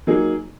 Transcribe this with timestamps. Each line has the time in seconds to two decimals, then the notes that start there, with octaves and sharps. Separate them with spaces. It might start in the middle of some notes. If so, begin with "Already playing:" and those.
0.07 F#3 A#3 D#4 G#4